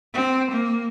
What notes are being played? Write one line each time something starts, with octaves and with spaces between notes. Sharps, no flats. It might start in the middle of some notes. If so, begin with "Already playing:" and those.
C4
A#3